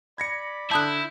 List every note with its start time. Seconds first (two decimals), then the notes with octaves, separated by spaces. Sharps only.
0.18 D5 B5 G#6 A#6 C#7
0.71 D3 E4 A5 D#6 F#6 G6